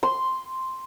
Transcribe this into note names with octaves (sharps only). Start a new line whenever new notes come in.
C6